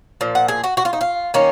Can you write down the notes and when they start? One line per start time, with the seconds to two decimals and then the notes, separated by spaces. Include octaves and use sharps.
0.21 A#2 F3
0.35 F#5
0.48 G#4
0.64 F#4
0.77 F#4
0.85 F4
0.93 D#4
1.01 F4
1.34 D#3 A#3 C#4 D#4